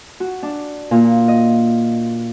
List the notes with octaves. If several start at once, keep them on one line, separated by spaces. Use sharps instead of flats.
F#4
D4
A#2
D#5